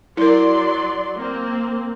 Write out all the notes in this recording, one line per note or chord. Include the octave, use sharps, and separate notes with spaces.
F#3 E4 A#4 D5 C6
A#3 C4